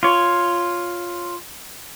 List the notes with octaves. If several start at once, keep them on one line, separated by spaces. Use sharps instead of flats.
F4 C#5